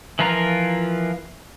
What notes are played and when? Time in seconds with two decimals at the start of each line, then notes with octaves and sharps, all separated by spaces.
0.19 E3 F3 F4 A#4 A#5